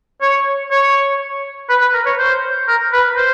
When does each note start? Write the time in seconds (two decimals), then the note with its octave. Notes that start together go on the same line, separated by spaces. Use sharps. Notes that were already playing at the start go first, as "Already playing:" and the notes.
0.22 C#5
0.71 C#5
1.69 B4
1.81 B4
1.94 A#4
2.06 C#5
2.19 C5
2.68 A#4
2.93 B4
3.17 C5